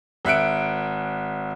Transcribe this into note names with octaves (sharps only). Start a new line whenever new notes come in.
G#1 E5 F#6 C#7 D7